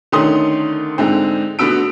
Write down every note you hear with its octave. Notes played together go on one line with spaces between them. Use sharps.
D3 D#3 A3 C#4 C6 D#6
G#2 D3 C4
D3 A3 B3 F#4 E6 D7